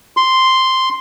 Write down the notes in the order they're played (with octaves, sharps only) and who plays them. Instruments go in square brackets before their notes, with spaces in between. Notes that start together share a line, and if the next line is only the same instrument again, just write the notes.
[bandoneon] C6